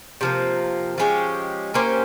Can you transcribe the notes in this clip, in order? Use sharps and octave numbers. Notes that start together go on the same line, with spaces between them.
C3 F3 A#3
F3 G#3 C#4 G4
A#3 C#4 G4 C5